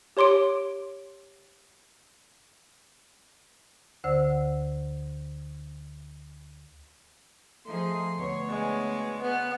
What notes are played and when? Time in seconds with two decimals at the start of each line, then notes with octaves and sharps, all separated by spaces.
0.17 G4 C#5 C6 D6 D7
4.04 D2 D3 C5 F#5 E6
7.66 F3 A3 D#4 G#4 C6
8.18 D2 B3 C#5
8.49 G#3
9.22 B3 B4